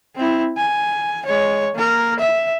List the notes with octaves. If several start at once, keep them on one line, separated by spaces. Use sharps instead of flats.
C4 E4
G#5
G#3 C#5
A#3 A#4
E5